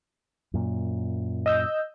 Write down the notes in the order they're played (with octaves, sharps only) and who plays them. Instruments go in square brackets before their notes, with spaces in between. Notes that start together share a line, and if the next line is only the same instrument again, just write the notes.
[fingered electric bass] F#2 A#2
[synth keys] D#5 E6 G6